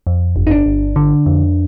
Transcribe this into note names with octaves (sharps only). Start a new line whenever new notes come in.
F2
G1
D#4
D4
G1
D3
F2